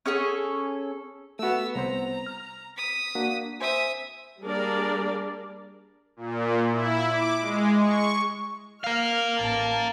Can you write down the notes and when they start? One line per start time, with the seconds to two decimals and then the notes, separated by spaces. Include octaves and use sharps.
0.06 C#4 G#4 A4 C#6
1.39 A3 B3 F#4 E6
1.75 C2 B3 C5 A#5
2.26 F6
2.77 D#6 B6
3.15 A#3 D4 F#4
3.61 C5 E5 G#5 D#6
4.43 G3 A#3 D4 G#4 A#4 D5
6.17 A#2
6.71 E4
7.06 D6
7.39 G#3
7.78 C#6
8.84 A#4 F5 F6
9.40 A1 A5